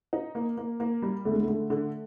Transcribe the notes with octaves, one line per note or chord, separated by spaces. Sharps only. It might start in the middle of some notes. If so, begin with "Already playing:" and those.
D#4
A#3
A#3
A#3
G3
D3 A3
G#3
A3
D3
D3